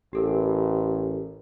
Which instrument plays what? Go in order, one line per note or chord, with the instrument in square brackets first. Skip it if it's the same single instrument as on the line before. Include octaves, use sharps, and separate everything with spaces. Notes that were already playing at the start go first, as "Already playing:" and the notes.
[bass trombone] A1 [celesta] G4 A4 A#4